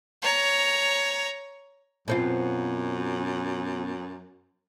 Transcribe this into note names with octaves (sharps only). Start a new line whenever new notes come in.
C#5 A#5
F#2 B2 C4 F4